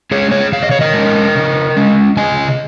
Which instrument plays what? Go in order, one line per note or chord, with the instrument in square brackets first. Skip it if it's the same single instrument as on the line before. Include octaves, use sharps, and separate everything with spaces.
[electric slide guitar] G#3 C#4 G#4 C#5
G#4 C#5
C#3 F5
D#5
C#5
A#4 D#5
G#3 C#4
C#3
G#3 C#4
C#3 D#5 G#5